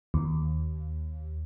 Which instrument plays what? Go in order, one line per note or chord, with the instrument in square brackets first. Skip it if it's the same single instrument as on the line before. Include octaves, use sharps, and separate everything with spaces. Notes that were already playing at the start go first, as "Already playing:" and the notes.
[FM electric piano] D#2